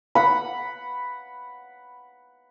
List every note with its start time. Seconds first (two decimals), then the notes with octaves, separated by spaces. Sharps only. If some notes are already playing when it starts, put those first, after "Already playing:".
0.15 F#5 B5